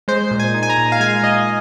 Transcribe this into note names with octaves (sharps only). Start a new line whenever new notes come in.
G#3 C5
A#2
G#5
D#4
G#5
A#5
A#2
F5
G#3 G#5
A#2 D#5